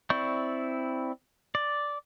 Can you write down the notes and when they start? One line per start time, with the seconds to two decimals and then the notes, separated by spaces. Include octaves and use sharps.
0.10 C4 E4 D5 C#6 G6
1.55 D5